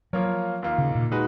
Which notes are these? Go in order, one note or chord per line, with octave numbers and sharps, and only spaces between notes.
F3 F#3 A#3 F4 A#4 C#5
D#2 D#3 A#3 F4
C#3
A#2
D#3 G#3 D#4 F#4 B4